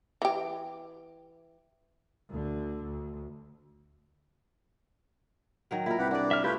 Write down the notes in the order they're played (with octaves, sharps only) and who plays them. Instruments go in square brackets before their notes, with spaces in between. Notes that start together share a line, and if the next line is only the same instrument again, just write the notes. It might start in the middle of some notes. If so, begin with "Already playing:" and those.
[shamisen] E3 G4
[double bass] D2 D3
D2
[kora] D#3 F#3 A#4
[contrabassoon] A#2 [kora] E4 A#4
[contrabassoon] C2 [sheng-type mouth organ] G4 B4 F#5
[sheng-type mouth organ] D4 [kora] F#4 D5
[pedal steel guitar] E5 F6
[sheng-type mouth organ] A3 F4 B4 [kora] E4 [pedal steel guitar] G4 G6